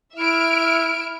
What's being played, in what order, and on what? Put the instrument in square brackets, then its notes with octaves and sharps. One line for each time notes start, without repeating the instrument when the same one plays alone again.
[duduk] E4 [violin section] E5 F6 D7